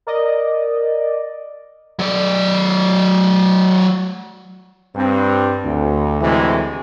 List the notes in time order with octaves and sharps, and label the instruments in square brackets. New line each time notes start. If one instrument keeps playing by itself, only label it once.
[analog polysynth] A#4 D5 D#5
[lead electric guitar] F#3 D5
[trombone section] G2 C4
D2
D2 A2 C3 E3 G#3